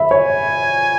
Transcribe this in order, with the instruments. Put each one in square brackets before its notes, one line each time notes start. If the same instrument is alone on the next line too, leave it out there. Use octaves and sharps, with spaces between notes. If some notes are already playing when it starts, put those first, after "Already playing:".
Already playing: [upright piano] E5 B5
[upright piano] C#5 [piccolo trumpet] G#5